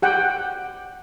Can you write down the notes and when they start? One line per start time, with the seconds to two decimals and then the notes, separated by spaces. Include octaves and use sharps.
0.02 G4 F#5 G5